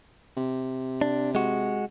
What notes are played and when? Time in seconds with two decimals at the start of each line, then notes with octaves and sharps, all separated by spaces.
0.37 C3
1.01 D4
1.35 G#3 F#4